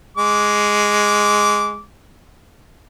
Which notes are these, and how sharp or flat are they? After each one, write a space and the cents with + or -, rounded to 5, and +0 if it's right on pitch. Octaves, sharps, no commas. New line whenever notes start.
G#3 +0 D6 -20